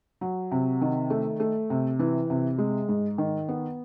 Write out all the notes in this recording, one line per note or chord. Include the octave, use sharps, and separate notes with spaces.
F#3
C3
D#3
A3
A3
C3
E3
C3
G#3
G#2
D#3
B3